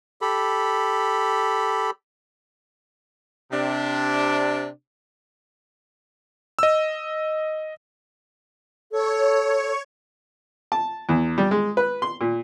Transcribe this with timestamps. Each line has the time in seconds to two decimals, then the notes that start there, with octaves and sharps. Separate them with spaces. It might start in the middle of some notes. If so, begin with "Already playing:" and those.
0.21 G4 A4 B5
3.52 C3 D4
6.59 D#5 E6
8.91 A4 C#5
10.72 A5
11.09 E2
11.38 G3
11.51 G#3
11.77 B4
12.02 C6
12.21 A#2